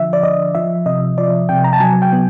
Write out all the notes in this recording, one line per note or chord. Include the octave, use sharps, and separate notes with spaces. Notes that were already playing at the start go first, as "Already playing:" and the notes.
Already playing: D3 F3 E5
D5
D3 D#5
F3 E5
C3 D#5
F3 D5
C3 G5
A#5
A5
F#3 G#5
G5
B3